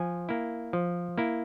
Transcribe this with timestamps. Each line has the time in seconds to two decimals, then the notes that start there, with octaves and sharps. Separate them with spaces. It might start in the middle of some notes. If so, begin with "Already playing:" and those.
Already playing: F3 G#5
0.29 A#3 E4
0.73 F3
1.18 A#3 E4